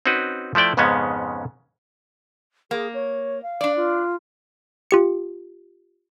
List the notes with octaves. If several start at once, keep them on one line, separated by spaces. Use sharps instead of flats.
C4 C#4 D#4 F#4 B4
F3 A3 E4 D5 G5
F2 G#2 C#3 G#3 B3 C#4
A#3 G#4
C#5
F5
D4 D5
F4
F4 G4 C#7